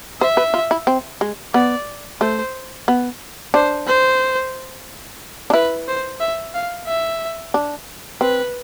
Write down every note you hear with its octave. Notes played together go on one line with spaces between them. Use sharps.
C5 E5
B4
F4
E4
C4
G#3
B3 D5
A3 C5
B3
D4 C5
C5
D4
E4 B4
C5
E5
F5
E5
D4
C4 B4